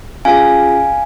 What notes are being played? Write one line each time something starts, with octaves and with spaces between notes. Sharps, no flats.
C#4 F4 G#4 F5 G#5